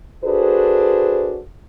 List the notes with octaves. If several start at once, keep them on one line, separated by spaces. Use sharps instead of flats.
D4 F#4 G#4 A4 B4 C5